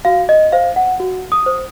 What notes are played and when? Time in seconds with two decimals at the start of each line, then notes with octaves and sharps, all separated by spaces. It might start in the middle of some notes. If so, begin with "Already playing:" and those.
0.05 F#4 F5
0.29 D#5
0.52 C5 F5
0.76 F#5
1.00 F#4
1.32 D#6
1.46 C5